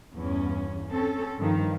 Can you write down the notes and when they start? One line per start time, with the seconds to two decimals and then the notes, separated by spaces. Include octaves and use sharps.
0.16 E2 G2 C#4
0.90 C4 C#4 A4
1.39 G2 D#3 F3